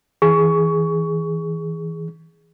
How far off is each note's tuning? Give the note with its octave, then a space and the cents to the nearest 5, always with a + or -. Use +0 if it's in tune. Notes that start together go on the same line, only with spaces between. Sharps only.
E3 -25 G#4 +0 C#6 +20